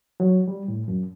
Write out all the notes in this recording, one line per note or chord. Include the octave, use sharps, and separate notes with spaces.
F#3
G3
A2
F#2